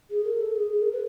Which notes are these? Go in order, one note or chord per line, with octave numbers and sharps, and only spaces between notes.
G#4
A#4
A4
G#4
G#4
A#4
B4